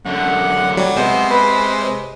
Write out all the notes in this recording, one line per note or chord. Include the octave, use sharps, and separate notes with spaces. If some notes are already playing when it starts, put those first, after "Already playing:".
F#2 D3 F#5
F#3 G3
C3 G#3 B3 C5
B4